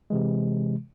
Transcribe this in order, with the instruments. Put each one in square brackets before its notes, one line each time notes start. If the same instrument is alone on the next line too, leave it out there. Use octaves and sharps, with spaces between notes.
[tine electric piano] C3 E3 G#3